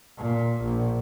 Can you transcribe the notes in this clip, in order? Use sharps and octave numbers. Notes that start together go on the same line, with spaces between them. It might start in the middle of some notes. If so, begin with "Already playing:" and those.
A#2
A#1